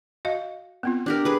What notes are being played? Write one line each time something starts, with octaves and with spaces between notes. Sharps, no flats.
F#4 D#5 F5
B3 C4 F4
D4 G4 A#4
G#4 B4